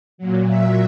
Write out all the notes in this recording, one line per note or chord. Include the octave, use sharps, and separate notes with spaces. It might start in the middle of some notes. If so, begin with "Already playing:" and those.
A#2 F#3
E5